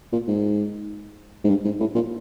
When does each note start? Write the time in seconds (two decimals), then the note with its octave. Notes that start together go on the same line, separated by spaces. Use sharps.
0.12 A#2
0.28 G#2
1.44 G#2
1.50 G2
1.65 G#2
1.80 A2
1.95 A#2